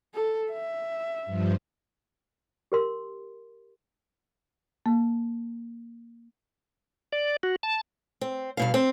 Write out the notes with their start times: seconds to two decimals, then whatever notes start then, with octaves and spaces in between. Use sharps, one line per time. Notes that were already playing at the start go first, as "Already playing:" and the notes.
0.14 A4
0.51 E5
1.26 G2 F3
2.72 G4 A#4 C6
4.86 A#3
7.12 D5
7.43 F#4
7.63 A5
8.21 C4
8.57 G2 B2 F5
8.74 C4